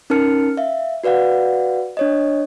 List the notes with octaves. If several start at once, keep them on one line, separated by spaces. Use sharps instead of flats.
C#4 D#4 A#4 A5 F6 C#7
E5 F5
F#4 B4 D5 F5 F#5
D4 C#5 D#5